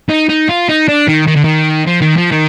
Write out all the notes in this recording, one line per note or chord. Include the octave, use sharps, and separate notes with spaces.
D#4
D#4
F4
D#4
D4
D#3
D#3
D3
D#3
F3
D#3
F3
D#3